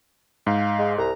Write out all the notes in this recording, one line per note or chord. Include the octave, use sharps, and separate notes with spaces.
G#2 F5
G#3
C2 A#5